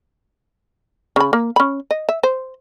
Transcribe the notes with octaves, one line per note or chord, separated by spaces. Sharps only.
C#3 B5
A#3
C#4 B5
D#5
E5
C5